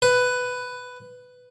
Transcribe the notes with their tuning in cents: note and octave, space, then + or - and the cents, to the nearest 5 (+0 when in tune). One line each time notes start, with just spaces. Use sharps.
B4 +10